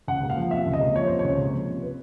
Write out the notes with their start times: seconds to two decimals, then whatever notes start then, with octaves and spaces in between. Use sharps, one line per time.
0.08 C#2 F#5
0.23 A#3
0.30 F5
0.37 F3
0.51 C3 E5
0.66 C#2
0.73 D#5
0.81 A#3
0.95 F3 C#5
1.07 C3 C5
1.19 C#5
1.24 C#2
1.39 A#3
1.53 F3
1.68 C3
1.82 B4